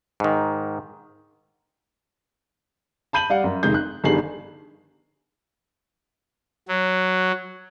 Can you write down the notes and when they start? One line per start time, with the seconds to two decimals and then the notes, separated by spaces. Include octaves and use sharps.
0.20 G#2 D#3
3.13 A5 B5 G6 D#7 F#7
3.30 G3 D5 F5 F#5
3.44 F#2
3.63 F1 D#3 G#3 D#4 G6
3.74 F#6
4.04 G1 G2 D#3 G#4 C7 F#7
6.68 F#3